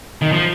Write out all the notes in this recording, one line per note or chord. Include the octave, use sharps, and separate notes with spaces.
D#3
F3